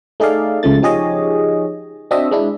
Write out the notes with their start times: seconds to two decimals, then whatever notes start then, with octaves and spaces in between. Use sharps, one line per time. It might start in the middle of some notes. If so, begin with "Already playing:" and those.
0.20 A3 D#4 G#4 A4 D5 F5
0.63 C#2 C#3 F3 A3 A6
0.82 F3 D#4 G4 G#4 C#5 D#5
2.11 C4 D4 F#4 D#5 E5
2.31 G#3 D4 E4